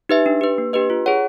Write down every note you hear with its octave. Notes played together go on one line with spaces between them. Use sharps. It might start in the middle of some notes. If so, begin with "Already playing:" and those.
D#4 G4 B4 E5
D4
G4 B4
A#3
D4 G4 B4 D#5
F4
G#4 C#5 F#5